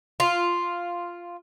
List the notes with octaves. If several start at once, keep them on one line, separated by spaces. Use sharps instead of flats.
F4